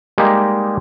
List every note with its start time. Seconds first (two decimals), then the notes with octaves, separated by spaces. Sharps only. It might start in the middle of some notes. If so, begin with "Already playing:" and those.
0.18 G3 G#3 A#3 D#4 G4